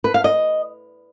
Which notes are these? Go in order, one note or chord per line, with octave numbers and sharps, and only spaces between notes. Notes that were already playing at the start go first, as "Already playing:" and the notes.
B4
F5
D#5